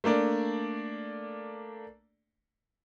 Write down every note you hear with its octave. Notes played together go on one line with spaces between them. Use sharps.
A3 A#3 D4 D5